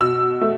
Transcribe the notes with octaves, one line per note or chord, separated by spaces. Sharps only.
B2 E6
A3